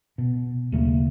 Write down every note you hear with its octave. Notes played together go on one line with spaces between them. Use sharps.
B2
D#2 C#3 A3 A#3